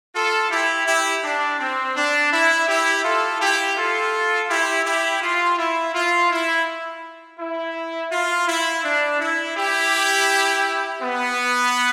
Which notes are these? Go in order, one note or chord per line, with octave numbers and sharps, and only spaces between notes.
F4 A4
E4 G4
E4 G4
D4
C4
D4
E4
E4 G4
F4 A4
E4 G4
F4 A4
E4 G4
E4 G4
F4
E4
F4
E4
E4
F4
E4
D4
E4
E4 G4
B3